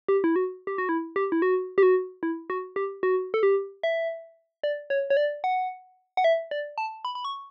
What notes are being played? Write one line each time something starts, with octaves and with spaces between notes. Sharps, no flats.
G4
E4
F#4
G4
F#4
E4
G4
E4
F#4
G4
F#4
E4
F#4
G4
F#4
A4
G4
E5
D5
C#5
C#5
D5
F#5
F#5
E5
D5
A5
B5
B5
C#6